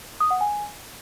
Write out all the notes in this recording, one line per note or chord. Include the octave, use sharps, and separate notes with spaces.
D#6
F#5
G#5